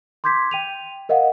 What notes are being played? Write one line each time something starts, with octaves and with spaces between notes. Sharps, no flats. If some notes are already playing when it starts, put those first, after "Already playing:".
C6 D6 G6 G#6 B6
G5 D#7 F7
A#4 D#5 F5 F#5